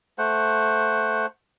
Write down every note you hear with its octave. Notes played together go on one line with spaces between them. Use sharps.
A3 C5 F#5